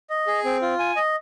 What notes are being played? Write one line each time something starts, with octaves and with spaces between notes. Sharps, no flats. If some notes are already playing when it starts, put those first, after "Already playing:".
D#5
G#4
C4
F4
G#5
D#5